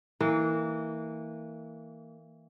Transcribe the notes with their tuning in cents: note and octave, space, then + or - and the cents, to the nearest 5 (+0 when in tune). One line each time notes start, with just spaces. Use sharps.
E3 -25 A#3 -25